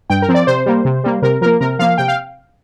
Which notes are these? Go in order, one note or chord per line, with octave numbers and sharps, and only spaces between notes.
G2 G5
A#4
F3 C4
D5
C3 C5
G3 A#3
C3
G3 A#3
C3 A#4
F3 A#3 A#4
C3 A#4
F3 A#3 F5
C3 G5
F5